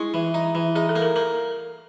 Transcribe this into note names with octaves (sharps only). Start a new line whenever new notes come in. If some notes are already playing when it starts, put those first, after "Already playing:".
Already playing: G#3 E4
E3
D#4
E3
D#4 G#4
A4
A#3
A#4
A#3 A#4